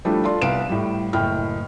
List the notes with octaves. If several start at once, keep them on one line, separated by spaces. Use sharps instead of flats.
F3 G3 A3 D4 E4 A4
F4 A4 D5 C6
C2 B3 F5 D7 E7
A2 G3
F#1 A2 G5 F6